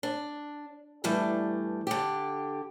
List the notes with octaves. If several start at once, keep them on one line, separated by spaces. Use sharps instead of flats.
D4
G2 E3 G3 A3 D4
D3 G4